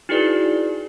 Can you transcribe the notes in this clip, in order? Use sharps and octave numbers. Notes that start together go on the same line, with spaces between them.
D#4 E4 F#4 G#4 B4 D5